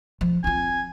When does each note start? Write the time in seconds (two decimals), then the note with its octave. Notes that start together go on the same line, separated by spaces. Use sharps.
0.21 F3
0.44 C4 F4 G#5